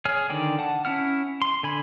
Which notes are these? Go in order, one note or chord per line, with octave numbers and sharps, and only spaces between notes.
G#4 C#5 G#5 F6
D3 D#3 D5 G5
F#5 A5
C#4 E4 F#5 F6
C6
D3 G#5 B5